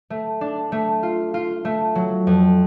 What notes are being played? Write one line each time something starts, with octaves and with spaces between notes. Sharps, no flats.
A3
D4
A3
F4
F4
A3
F#3
F2